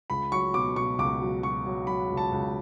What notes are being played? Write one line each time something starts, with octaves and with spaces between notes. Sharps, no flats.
C#2 B5
F#3 C#6
B2 D6
B2 C#6
C#2 D6
F#3
F#3 C#6
F#3
F#3 B5
C#2
A5
C#2